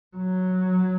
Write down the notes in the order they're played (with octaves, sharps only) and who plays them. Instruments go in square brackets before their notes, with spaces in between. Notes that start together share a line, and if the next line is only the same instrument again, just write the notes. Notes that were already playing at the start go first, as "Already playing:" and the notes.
[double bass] F#3